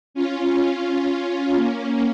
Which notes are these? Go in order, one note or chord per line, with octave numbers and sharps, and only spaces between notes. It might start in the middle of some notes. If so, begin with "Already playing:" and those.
C#4 F4
A#3 C#4